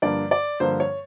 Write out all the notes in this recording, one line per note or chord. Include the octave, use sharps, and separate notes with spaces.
G2 D3 F3 A#3 D5
D5
G2 D3 F3 A#3 C5
C#5